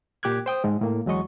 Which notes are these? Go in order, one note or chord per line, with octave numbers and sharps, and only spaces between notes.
A#2 G4 D6 F#6 G#6
C5 G5 D#6
G#2 G#3
A2 A#3
E2 F#3 G#3 D#5 C#6